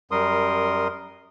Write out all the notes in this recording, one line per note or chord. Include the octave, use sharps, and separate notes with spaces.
F#2 G3 A#4 C6 D#6